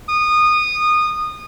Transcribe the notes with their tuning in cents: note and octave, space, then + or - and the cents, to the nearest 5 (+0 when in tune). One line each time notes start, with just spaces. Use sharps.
D#6 -20